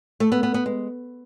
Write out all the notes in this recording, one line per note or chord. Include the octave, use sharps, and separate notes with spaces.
A3
B3
B3
B3
G#3